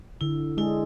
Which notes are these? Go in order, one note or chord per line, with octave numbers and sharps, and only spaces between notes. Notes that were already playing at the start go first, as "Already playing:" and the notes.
D3 E4
G#3 D4 E4 G#4